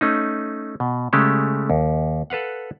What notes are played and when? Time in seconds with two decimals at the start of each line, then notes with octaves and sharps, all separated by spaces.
0.01 A3 C#4 D#4
0.80 B2
1.13 C#3 G#3 A3 C#4 G4 A4
1.70 D#2
2.30 A4 B4 F5 F#5